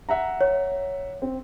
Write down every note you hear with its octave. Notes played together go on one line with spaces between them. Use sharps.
E5 F#5 A#5
C#5
C4